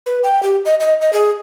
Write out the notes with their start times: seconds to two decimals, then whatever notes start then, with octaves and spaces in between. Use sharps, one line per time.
0.06 B4
0.23 G5
0.43 G4
0.65 D#5
0.80 D#5
1.01 D#5
1.13 G#4